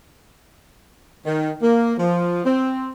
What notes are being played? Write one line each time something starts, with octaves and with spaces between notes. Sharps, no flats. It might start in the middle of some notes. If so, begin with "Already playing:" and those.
D#3
A#3
F3
C4